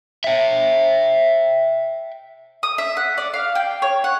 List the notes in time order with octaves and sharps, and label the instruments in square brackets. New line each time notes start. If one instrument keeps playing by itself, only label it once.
[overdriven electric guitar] E5 G5
[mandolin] D#6
E5
F#5
D5
F5
G5
C#5
F#5